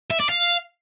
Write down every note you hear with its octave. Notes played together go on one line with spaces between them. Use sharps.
E5
D5
F5